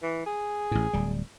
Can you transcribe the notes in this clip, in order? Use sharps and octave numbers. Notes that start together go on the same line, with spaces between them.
E3
G#4
A1 A2
D1 G3